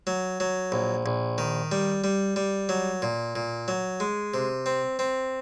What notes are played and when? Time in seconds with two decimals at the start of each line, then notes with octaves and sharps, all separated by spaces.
0.07 F#3
0.40 F#3
0.72 A#1
1.06 A#1
1.38 D#3
1.72 G3
2.04 G3
2.36 G3
2.69 F#3
3.02 A#2
3.36 A#2
3.68 F#3
4.00 G#3
4.34 C3
4.66 C4
4.99 C4